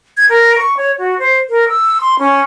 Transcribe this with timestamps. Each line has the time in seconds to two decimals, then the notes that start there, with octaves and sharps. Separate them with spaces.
0.17 G#6
0.29 A#4
0.58 C#6
0.77 C#5
0.99 F#4
1.19 C5
1.49 A#4
1.69 E6
2.01 C6
2.19 C#4